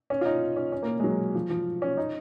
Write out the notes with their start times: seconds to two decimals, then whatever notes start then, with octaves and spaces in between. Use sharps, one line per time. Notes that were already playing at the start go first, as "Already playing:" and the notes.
0.10 C#4
0.21 F4
0.25 D#4
0.57 C#4
0.72 C#4
0.83 A#3
1.00 G#3
1.04 F#3
1.35 F3
1.50 F3
1.82 C#4
1.97 D#4